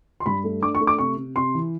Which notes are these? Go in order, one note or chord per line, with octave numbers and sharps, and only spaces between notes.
C6
G2 B5
A3
D4 D6
C#6
A3
D6
C3 C#6
C3
C3 C6
E3